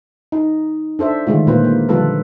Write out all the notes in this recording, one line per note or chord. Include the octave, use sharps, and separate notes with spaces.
D#4
D4 A4 C5 E5
D3 D#3 G#3 A3 F4
A#2 A#3 F4 B4 C5
A#3
D3 F3 G3 F4 A4 B4